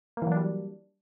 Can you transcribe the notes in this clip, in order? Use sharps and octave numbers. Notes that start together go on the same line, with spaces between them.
E3 F#3 G3 A#3 D4